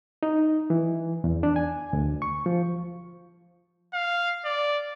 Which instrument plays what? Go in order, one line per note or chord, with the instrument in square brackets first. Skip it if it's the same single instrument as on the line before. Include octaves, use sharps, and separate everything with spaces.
[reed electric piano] D#4
E3
E2
D4
G#5
D2
C#6
F3
[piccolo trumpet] F5
D5